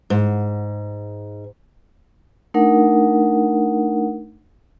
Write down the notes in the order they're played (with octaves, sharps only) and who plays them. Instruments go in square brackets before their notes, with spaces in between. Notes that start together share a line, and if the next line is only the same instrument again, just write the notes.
[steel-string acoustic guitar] G#2
[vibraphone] A3 D4 D#4 A#4 F#5